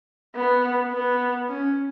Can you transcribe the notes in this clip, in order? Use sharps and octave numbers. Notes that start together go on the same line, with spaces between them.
B3
B3
C#4